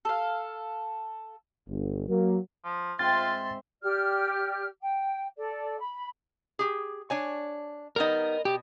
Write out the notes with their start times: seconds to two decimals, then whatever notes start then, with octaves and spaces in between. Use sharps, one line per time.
0.05 A4 F5
1.68 G1
2.09 F#3 A#3
2.65 F3
2.99 G#2 C4 F4 E5 C6 A6
3.82 G4 D5 F6
4.81 G5
5.37 A4 D5
5.78 B5
6.59 G4 G#4
7.10 D4 C#5 G#5
7.96 G3 B3 D#4 A#4 D#5
8.45 B2 G4